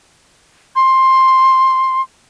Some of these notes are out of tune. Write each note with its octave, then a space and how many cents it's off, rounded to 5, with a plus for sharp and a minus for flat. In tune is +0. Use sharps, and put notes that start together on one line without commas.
C6 +10